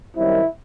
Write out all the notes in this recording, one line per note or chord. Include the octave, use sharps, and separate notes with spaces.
F#2 D#3 G3 C4 E4